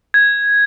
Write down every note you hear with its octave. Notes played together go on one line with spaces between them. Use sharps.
G#6